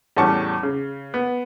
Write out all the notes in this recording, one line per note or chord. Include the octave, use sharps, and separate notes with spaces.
E2 A2 G3 C#4 A5 C#6
C#3
B3